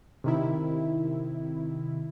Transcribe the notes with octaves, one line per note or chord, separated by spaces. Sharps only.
C3 D#3 E4